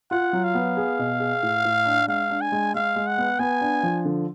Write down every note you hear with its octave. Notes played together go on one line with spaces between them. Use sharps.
F4 F#5
F#3
F5
B3
G#4
B2
G#4
A2
A2
D4
G#3 F5
D4
G#5
G#3
G#3 F5
G#3
F#5
B3
B3 G#5
D4
F3
D3